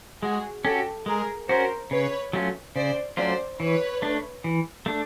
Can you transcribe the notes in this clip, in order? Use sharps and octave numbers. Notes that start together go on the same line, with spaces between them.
G#3 F#4 G#4
C#4 F#4 G4 A4
G#3 G#4 A#4
C#4 F#4 A#4 C5
C#3 B4 C#5
F#3 A3 C#4 F4
C#3 C5 D5
F#3 A3 C#4 F4 C5 D5
E3 B4 C#5
A3 D4
E3
A3 D4